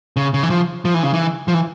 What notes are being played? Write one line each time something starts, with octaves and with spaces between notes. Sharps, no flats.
C#3
C#3
E3
F3
F3
E3
C#3
E3
F3
E3